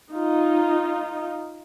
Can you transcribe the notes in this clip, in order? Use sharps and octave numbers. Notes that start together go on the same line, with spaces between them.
D#4 F4